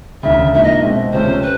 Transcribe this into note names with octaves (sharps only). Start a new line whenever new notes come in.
E1 D2 C#3 E5
G#2 F3 A#3 D4 E5
D#5
B2 G#3 C4
C#2 C3 F3 A3 C#4 C5
B4